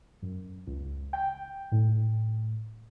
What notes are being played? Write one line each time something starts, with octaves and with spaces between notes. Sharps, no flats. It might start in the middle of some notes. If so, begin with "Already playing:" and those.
F#2
C#2
G5
A2